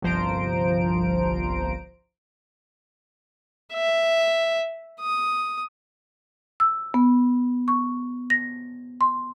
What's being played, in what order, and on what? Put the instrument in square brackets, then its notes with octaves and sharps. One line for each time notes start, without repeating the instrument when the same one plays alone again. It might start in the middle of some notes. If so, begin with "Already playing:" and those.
[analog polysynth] G1 C2 F3 C5 A#5 D7
[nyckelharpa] E5
D#6
[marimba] E6
B3
C#6
A#6
C6